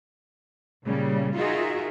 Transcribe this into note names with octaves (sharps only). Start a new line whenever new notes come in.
A#2 C#3 G3
D#4 F4 F#4 G#4 A#4 E5